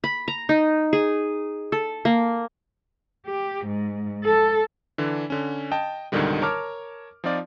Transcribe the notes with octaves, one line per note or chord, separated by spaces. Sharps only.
B5
A#5
D#4
G#4
A4
A#3
G4
G#2
A4
D3 E3 D4
D3 C#4
D#5 G5 A5
C#2 G#2 B2 D3 D#3 G3
A#4 C#5 A5 D6 F6
F3 C4 D#4 F4 D5